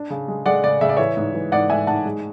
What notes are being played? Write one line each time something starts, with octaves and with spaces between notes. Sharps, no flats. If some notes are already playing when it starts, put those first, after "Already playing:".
Already playing: D4
C#3
G#3
G#3 D5 F#5
C#3 D5
C#3 E5
D5
E3 C#5 E5
G#2
E3
G#2 D5 F#5
G#2 E5 G#5
G#2 F#5 A5
G#3